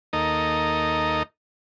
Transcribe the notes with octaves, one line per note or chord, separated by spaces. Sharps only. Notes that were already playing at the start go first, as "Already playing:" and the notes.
D#2 A#3 D#4 A4 D#5 A#5